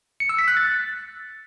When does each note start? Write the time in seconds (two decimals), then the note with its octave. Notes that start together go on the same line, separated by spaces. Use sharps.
0.20 C#7
0.29 E6
0.39 B6
0.48 F#6
0.57 A6